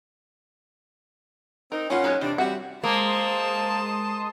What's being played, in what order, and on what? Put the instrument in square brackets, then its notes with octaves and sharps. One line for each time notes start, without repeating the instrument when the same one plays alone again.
[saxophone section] C4 D#4 [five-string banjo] A#4
[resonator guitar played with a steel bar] E2 F4 F#5 [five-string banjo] A#3 [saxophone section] C#4
[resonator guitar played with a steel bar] A#2 F#3 G#3 [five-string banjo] D#4 C#5
[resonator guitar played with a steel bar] E2 [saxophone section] C3 D4
[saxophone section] G3 F#4 [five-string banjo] C4 E5 F#5
[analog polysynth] G#3 C6 D#6 [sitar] A#3 [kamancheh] C5 [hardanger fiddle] A5